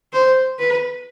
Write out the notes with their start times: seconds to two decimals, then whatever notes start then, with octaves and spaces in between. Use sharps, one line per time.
0.13 C5
0.59 B4